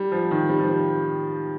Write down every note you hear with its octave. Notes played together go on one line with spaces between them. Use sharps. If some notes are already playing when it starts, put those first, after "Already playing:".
Already playing: G3
F3
D#3
G3
F3
G3